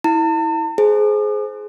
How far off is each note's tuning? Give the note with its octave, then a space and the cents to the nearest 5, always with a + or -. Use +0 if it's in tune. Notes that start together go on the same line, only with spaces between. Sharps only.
E4 -20 A5 +45
G#4 +20 C5 +0